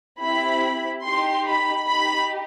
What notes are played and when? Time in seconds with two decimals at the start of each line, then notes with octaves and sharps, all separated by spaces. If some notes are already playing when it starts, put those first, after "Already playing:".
0.21 C4 E4 G4 B5
1.05 D#4 G4 C6
1.47 B5
1.89 D#4 G4 B5